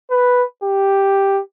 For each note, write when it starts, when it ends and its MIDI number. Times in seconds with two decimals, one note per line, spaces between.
0.11 0.43 71
0.63 1.40 67